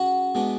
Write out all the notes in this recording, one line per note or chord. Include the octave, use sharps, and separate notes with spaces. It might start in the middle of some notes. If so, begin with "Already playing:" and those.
Already playing: C#3 F#4 F#5
B2 G#3 B3 D4